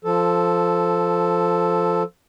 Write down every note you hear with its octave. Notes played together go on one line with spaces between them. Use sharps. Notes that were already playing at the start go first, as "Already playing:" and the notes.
F3 A4